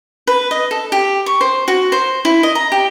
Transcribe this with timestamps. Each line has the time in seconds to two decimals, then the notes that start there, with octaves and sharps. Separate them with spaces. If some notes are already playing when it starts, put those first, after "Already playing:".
0.27 B4
0.51 D#5
0.71 A4
0.92 G4
1.26 C#6
1.41 C5
1.68 F#4
1.92 C5
2.25 E4
2.43 D#5
2.55 A#5
2.72 G4